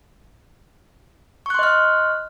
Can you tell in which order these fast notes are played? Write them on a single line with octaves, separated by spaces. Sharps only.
C#6 F#6 C6 D#5 F6